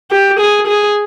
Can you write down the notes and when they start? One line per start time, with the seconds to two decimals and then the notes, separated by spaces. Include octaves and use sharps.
0.11 G4
0.40 G#4
0.68 G#4